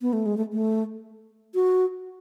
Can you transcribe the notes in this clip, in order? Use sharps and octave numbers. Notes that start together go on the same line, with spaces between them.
B3
A3
G#3
A3
A3
F#4